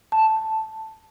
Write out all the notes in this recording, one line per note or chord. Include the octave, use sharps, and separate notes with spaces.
A5